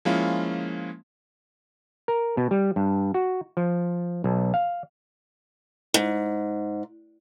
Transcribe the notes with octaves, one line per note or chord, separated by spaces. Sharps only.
F3 G#3 A#3 C#4 E4 F4
A#4
B2
G3
G2
F#4
F3
B1
F5
G#2